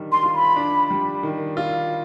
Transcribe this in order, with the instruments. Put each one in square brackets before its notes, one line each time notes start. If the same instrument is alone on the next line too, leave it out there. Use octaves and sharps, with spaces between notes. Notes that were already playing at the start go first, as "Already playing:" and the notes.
Already playing: [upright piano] D#3 G3 D4
[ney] C6
[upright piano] F4
[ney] B5
[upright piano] D4
G3
D#3
F4